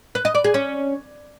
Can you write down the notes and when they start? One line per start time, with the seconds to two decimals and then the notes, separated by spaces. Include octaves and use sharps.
0.15 B4
0.25 D#5
0.35 D5
0.44 G#4
0.54 C#4